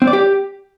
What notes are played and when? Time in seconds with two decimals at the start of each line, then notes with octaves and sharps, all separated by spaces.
0.02 C4
0.07 D5
0.13 G4